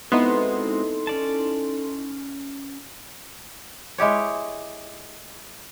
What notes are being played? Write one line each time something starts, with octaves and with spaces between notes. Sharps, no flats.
G#3 B3 C4 D#4 E4 F#4 A4 C6
C#4 D5 A5
G#3 E4 G4 C#5